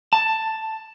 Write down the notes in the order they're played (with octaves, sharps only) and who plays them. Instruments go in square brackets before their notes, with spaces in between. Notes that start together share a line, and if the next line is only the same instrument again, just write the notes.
[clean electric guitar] A5